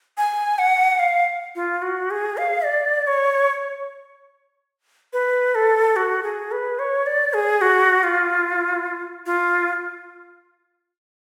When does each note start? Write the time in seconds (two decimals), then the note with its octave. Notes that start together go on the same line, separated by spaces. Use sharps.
0.18 G#5
0.58 F#5
0.99 F5
1.56 F4
1.82 F#4
2.11 G#4
2.37 F5
2.65 D5
3.07 C#5
5.13 B4
5.55 A4
5.96 F#4
6.23 G#4
6.52 B4
6.79 C#5
7.06 D5
7.33 G#4
7.61 F#4
8.03 F4
9.26 F4